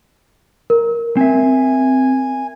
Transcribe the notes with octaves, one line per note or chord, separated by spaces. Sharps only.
A#4
C4 E5 G#5